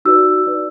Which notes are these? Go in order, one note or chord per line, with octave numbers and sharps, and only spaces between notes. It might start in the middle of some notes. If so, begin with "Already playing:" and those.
D#4 F#4 B4 D5 E6
D#4 F#4 B4 D5